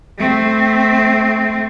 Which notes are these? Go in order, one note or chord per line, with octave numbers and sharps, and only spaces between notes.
A3 C4